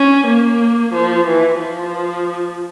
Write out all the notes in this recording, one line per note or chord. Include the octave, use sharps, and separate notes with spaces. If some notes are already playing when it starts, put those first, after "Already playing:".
Already playing: C#4
A#3
F3
E3
F3